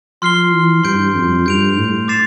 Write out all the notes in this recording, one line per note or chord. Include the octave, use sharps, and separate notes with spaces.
F3 C6 F6 C7 G7
E3
G2 C6 G6 D7
F2
G2 G6 D7 F7
A2
D6 A6 C7 E7